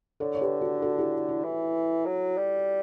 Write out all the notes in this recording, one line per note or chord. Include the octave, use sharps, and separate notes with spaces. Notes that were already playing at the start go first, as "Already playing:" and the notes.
D3 A4 C#5
C#5
G4 B4
F#4 A4
F#4 A4
E4 G4
E4
E3
F#3
G3